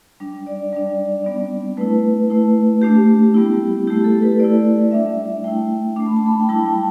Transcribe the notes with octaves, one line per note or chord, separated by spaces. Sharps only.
G3 D4
D5
G3 D4
G3 B3 D4
A3 E4 B4
A3 E4
A3 D4 G4
G3 B3 E4
A3 E4 G4
A4
B4
A3 E4 D5
G3 D4 E5
A3 E4 G5
A3 D4 D6
B5
A5
B5
G5
G3 E4 A5
G5